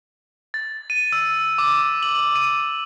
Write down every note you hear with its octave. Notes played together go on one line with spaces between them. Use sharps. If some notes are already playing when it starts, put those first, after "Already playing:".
A6
D#7
E6
D6
F#7
D#7